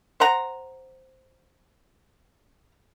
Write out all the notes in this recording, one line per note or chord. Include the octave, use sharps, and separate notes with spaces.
C5 F#5 A#5